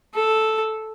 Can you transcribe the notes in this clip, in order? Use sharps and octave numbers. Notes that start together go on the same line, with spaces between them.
A4